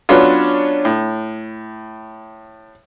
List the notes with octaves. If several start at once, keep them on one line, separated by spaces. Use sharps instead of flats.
F#3 B3 C#4 D4 F4
A2